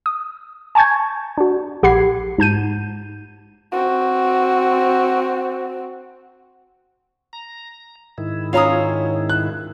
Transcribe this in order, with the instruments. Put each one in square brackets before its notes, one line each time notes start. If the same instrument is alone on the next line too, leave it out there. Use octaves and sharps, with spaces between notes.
[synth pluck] D#6
G#5 A5 C#6 G6 G#6
D4 F#4
A#1 G4 F#5 B5 G#6 C7
G#2 A5 G6 D#7
[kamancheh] C4 F#4
[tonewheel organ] A#5
G#2 D#3 E4
[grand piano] C#4 F4 [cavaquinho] F5 A#5 D#6
[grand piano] F#6